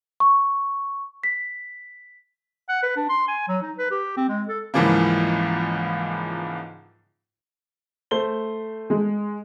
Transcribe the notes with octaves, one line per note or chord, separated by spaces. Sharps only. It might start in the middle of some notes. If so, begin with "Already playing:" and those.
C#6
B6
F#5
B4
D4
C6
G#5
F#3
D#4
B4
G4
C4
G#3
A4
C#2 G#2 E3 F3 G3 A#3
A3 C5 G7
G#3